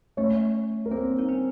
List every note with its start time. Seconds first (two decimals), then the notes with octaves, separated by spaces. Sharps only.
0.17 A3 C#4 C#5
0.86 A#4
0.91 A#3 C4 C5
1.19 D#4
1.29 C#4